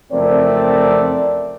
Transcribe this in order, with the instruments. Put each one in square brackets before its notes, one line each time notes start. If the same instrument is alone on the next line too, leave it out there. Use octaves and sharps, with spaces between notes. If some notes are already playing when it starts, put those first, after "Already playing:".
[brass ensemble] F#1 F2 A3 C4 A#4 D5